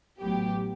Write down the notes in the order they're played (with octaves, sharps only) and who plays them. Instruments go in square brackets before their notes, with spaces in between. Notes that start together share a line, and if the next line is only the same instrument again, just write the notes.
[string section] A1 A2 F#3 B3 G4